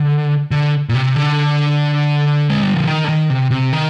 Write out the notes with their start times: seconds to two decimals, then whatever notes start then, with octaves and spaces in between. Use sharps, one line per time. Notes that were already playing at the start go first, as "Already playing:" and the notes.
Already playing: D3
0.51 D3
0.89 A#2
0.95 C3
1.16 D3
2.50 G#3
2.63 G3
2.74 F3
2.87 D#3
3.04 D3
3.09 D#3
3.30 C3
3.51 C3
3.73 D#3